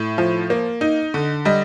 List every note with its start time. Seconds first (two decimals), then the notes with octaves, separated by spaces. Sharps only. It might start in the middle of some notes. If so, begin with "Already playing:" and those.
Already playing: A2
0.18 F3
0.50 A#3
0.81 D#4
1.14 D3
1.45 G3 D#5